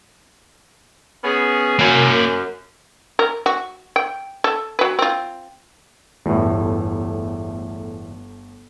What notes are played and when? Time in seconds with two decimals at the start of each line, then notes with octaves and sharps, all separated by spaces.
1.23 B3 C#4 G#4
1.79 F#2 A#3 G#5
3.19 A#4
3.46 F#4
3.96 G5
4.44 A4
4.79 F#3 B4
4.99 C4 F4
6.26 G1 E2 A2 A3